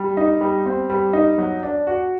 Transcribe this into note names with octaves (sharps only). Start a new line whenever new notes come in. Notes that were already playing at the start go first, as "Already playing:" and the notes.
Already playing: G3
D#4
G3
C4
G3
D#4
F#3
D4
F#4